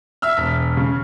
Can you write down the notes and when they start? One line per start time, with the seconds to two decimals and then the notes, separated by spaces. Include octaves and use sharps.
0.22 E5 E6 F6
0.37 E1 B6
0.77 C#3